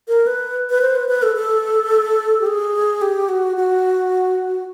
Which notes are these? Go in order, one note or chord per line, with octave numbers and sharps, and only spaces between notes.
A#4
B4
B4
C5
B4
B4
A4
A4
G4
G#4
G4
F#4
F#4